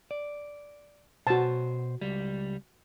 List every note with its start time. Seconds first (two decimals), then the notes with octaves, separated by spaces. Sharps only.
0.11 D5
1.27 B2 F#4 C5 A5
2.01 C#2 G3